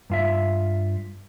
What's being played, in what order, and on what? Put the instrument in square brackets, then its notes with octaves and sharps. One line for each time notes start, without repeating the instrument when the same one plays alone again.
[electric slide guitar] G2 F4 E5